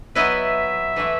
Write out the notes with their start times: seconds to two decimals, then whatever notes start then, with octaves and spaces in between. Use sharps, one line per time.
0.15 F#3 B3 E4 B4 D#5 E5
0.96 E3 A3 E4 B4